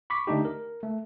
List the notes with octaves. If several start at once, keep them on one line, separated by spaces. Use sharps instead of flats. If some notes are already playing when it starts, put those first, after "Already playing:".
B5 C#6 D6 B6
D3 A3 D4 D#4 G4
A#4
A3